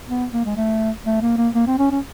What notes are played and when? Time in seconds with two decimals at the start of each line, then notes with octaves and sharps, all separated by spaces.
0.08 B3
0.32 A#3
0.45 G#3
0.56 A3
1.06 A3
1.22 A#3
1.38 A#3
1.54 A#3
1.67 C4
1.78 C#4
1.91 C#4